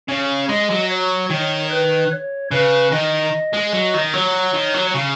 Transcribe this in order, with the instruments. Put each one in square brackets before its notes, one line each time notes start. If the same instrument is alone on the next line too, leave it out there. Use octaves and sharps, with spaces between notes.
[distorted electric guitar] C#3 [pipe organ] C#5
[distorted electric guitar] G#3 [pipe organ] D#5
[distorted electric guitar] F#3
[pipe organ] C#5
[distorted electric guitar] D#3 [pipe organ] C#5
[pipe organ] B4
C#5
[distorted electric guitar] C#3 [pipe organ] B4
[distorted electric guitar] D#3 [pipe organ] D#5
[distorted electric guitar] G#3
F#3
D#3
[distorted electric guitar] F#3 [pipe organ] C#5
[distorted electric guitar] D#3
F#3
C#3